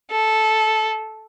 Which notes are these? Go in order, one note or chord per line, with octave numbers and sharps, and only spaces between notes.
A4